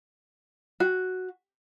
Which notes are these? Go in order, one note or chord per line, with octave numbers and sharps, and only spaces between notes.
F#4